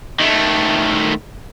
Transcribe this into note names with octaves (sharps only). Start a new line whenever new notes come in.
D#3 A3